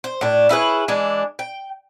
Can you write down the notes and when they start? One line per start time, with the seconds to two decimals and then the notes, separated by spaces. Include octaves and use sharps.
0.04 C5
0.21 A2 D4
0.49 C#4 E4 G#4 B4
0.88 E3 G#3 D4
1.39 G5